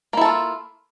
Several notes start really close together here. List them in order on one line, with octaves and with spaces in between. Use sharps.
A#3 E4 A4 F4